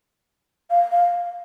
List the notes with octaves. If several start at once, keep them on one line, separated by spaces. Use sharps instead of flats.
F5
F5